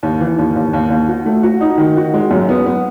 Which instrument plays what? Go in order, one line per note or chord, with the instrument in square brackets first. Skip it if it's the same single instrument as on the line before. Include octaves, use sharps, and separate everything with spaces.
[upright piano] D#2
E3
D#2
D#2
D#2
D#2
F#4
A3
F#4
D#4
D#3
F#4
G#3
F#2
B3
B3